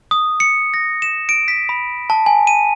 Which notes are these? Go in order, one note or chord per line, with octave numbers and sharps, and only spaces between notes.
D#6
C#7
A#6
E7
D7
B6
B5
A5
G#5
D#7